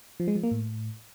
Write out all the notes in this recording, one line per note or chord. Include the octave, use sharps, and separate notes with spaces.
F3
G#3
F3
A#3
A2